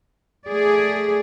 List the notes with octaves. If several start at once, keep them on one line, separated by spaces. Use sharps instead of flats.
A3 G#4 D5